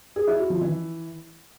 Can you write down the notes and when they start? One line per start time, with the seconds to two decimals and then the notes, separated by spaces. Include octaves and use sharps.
0.16 G#4
0.27 E4
0.39 F#4
0.50 F3
0.61 E3